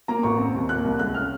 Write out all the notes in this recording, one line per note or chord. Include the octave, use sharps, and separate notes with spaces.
A#3 A#5
A1 C#6
C4
D#2
A#3 F#6
C2
C#2 F#6
F6